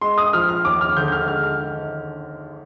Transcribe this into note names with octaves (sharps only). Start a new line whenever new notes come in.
G#3 C6
D#6
F3 F6
F6
D#2 D6
F6
D3 G6
G6
F6
G#3 F6
F6
D#3